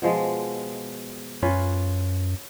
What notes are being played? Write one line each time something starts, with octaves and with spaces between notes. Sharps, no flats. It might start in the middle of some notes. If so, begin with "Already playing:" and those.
B2 F3 G#3
F#2 C#4 F4 B4